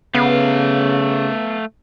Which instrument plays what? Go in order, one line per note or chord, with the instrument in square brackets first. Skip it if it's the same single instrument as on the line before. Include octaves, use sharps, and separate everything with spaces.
[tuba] C#3 [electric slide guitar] A3 F5 [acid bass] B3